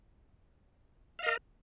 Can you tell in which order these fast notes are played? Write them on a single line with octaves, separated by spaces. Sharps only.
F5 D#5 A#4